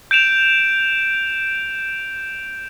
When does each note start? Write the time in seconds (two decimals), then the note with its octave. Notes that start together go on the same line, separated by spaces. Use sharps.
0.11 G6 D7 E7 F7